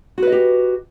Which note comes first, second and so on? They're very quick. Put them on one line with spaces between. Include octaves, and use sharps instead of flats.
F#4 B4 D#5 G4